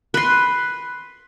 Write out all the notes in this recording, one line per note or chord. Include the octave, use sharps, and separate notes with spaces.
B4 C6